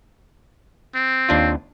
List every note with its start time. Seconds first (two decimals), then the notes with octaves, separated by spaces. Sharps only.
0.95 C4
1.29 D#2 D4 F4